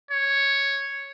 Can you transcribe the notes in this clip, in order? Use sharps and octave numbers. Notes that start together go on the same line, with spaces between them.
C#5